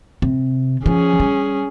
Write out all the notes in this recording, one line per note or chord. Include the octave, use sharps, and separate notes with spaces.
C3
F3 C#4 G#4
G3